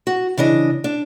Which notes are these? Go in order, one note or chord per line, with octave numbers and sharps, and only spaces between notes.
F#4
C#3 E3 D4 D#5
D4